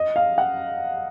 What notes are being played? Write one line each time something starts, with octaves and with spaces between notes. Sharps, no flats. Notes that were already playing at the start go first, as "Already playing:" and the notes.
Already playing: D#5
F5
F#5